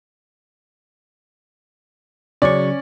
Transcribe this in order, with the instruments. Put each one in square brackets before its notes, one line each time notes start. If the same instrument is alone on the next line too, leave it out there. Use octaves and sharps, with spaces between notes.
[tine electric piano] C#3 F#3 C#6 [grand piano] C#4 D5